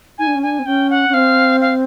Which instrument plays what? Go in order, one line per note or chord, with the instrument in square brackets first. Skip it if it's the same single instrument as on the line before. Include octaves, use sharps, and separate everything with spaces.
[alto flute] D#4 [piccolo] G#5
[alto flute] D4
C#4
[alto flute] D4 [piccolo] G#5
[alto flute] C4
[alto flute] C#4 [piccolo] G5
[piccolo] F#5
[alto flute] C#4
[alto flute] C4 [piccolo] F5
[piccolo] F5